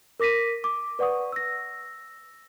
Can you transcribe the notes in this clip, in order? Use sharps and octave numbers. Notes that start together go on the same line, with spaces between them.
A#4 D6 A#6 B6 D#7
D6
B4 D5 F#5 C#6 D#6
E6 A#6